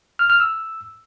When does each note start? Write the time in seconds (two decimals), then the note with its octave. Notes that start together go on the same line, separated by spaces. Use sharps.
0.19 F6
0.30 F6
0.40 E6